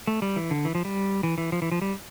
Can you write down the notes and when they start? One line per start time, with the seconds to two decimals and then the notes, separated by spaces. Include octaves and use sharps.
0.07 A3
0.22 G3
0.36 E3
0.51 D3
0.65 E3
0.75 F3
0.85 G3
1.23 E3
1.38 E3
1.52 F3
1.62 E3
1.72 F3
1.82 G3